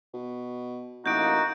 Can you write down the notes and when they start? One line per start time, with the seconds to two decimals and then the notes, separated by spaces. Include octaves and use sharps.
0.14 B2
1.06 A1 A#3 D#4 F#4 G6 D7